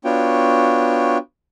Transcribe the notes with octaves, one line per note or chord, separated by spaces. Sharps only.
B3 D4 F4 F#4 C#5 G5